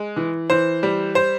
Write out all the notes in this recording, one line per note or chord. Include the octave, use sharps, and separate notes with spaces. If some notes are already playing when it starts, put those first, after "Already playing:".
Already playing: G#3
E3
E3 C5
G3
C5